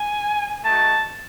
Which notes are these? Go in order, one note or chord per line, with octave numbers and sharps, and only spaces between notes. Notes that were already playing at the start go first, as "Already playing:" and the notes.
Already playing: G#5
A3 D#4 F#4 A5